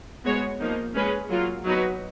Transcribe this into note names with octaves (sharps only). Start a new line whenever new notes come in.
G#3 B3 F#4 C#5
F3 A#3 D#4
G#3 C#4 G#4 B4
F#3 A#3 F4
F#3 B3 D#4 F#4 B4